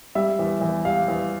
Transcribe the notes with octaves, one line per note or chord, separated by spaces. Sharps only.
G3 E5
E2
E2
G3 F5
E2